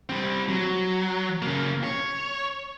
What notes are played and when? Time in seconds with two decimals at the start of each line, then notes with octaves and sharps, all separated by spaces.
0.09 G3 C4
0.48 F#3
1.42 C#3 A#3
1.84 C#5